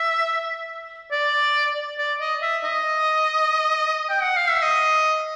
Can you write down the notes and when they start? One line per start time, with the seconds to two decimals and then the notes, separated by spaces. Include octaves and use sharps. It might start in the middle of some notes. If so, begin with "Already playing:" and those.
Already playing: E5
1.11 D5
1.98 D5
2.21 D#5
2.42 E5
2.64 D#5
4.10 G5
4.22 F#5
4.36 F5
4.50 E5
4.62 D#5